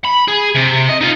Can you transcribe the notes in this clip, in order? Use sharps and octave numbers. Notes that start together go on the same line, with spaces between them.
B5
G#4
C3
D#5
D#4 F4